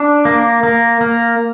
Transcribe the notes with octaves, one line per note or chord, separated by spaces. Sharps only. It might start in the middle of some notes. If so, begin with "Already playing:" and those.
Already playing: D4
A#3
A#3
A#3